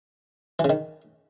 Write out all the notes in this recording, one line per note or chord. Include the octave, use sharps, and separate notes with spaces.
E3
C#3
D#3